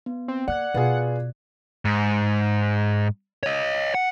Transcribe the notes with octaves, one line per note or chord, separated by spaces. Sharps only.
B3
C4
A#3 D5 F#5 F#6 G#6
B2 B3 F4 G#4
G#2
C#5 D#5
F#5